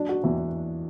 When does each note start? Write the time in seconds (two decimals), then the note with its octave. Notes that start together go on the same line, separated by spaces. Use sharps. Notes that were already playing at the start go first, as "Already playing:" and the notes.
Already playing: F#3 D4
0.09 F#4
0.24 E2